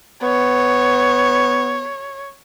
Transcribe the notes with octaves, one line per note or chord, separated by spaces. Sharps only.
B3 C#5